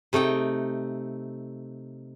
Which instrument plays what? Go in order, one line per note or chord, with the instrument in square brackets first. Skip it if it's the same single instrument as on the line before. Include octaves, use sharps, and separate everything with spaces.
[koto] C3 A3 D#4 G5